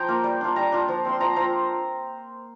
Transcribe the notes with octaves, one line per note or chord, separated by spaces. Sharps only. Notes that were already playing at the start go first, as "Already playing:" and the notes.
Already playing: F3 G5 A#5
A#3 F4
G3
D4 F4
G3 A#5
D4 F4
F3
C4 F4 C6
F3 A#5
C4 F4 A#5